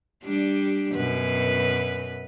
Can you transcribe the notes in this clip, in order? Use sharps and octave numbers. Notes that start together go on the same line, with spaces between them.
G3 D4
F#2 B2 B4